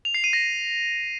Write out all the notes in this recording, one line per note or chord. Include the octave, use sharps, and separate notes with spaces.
F7
C7
D#7
A#6